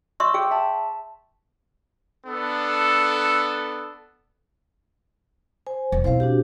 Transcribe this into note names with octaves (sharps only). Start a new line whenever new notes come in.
E5 C6 C#6 E6
G#4 F5 G5
E5 A5
B3 D4 A4
C5 G#5
E1
B2 C4 E4 C5 F5
D4 F#4 G4